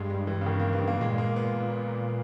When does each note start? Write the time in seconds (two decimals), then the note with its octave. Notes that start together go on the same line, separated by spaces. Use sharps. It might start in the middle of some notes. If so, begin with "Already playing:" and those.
Already playing: G2 G#3
0.10 G3
0.27 E3
0.41 C#3
0.46 D#3
0.60 A#3
0.73 B3
0.87 A#3
1.00 A#2 G#3
1.18 A#3
1.36 B3